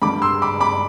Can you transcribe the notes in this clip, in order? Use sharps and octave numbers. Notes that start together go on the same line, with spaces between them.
G2 D3 G3 B5 D6
C6 E6
B5 D6
B5 D6